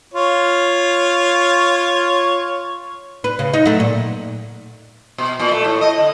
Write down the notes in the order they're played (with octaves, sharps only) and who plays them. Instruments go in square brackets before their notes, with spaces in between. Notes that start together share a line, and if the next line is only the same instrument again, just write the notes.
[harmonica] F4 C#5
[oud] B4
C#3
D#4
F#3 A3
A#2
[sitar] B2
A#2
A3
A2
D#5
D3